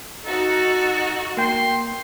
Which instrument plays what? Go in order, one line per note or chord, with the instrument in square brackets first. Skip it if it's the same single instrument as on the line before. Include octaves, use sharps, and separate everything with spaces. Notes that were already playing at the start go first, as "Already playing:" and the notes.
[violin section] D#4 F#4 [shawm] A4
[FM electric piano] A#3 G5 [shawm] C6